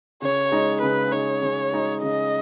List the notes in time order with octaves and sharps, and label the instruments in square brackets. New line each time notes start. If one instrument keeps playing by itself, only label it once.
[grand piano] C#3 [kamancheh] C#5
[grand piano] G#3 D#4
[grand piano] C#3 [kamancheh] B4
[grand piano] G#3 D#4 [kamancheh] C#5
[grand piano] C#3
G#3 D#4
[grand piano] C#3 [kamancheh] D#5